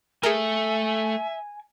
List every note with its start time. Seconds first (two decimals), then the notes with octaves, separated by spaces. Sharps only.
0.23 A3 G#4 A#4 E5 G#5